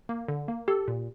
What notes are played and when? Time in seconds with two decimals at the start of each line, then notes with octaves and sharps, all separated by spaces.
0.09 A#3
0.28 D3
0.48 A#3
0.68 G4 A4
0.88 A#2